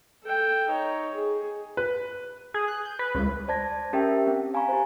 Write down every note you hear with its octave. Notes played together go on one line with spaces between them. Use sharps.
A4 G5
D#4 C#5
G#4
B4
G#4
F#6
G6
B4
C#2
C5 D5 A5 G#6 A#6
C#4 G4 A#4 E5 G5
C4
F5 G#5 A#5 B5 C#6
G4 C5